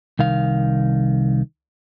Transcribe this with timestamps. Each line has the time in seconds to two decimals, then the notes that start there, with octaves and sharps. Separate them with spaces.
0.19 C2 D#3 F5